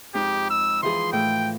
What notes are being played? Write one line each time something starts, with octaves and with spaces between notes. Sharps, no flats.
F2 G#3 D#4 G4
E6
E3 F3 G#4 C6
A2 G5